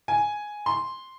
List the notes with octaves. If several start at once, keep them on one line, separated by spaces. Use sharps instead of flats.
G#5
C6